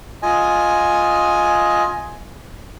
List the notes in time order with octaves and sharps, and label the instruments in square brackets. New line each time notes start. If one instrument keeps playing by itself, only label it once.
[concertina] F4 D#5 G#5